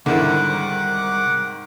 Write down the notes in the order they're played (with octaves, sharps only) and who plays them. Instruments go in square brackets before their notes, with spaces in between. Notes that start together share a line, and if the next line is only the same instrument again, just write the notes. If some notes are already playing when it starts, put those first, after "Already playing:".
[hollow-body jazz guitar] C2 E4 [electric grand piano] G#2 D#3 [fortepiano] D3 [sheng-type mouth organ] F#5 D6